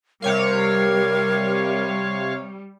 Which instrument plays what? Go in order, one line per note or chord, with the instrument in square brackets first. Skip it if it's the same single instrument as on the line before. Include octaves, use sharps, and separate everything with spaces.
[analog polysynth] C3 C#5 F5 [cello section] G3 [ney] A#4